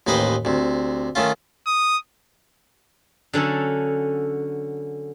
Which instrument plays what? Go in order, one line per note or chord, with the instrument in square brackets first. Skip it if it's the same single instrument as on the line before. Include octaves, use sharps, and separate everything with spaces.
[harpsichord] A1 D#2 D#4 B4 C5 G5
D2 C3
D#3 A3 C#4 F4
[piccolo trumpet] D#6
[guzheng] D3 F#3 C#4 A4